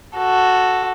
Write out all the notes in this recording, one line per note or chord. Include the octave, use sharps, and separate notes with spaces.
F#4 A4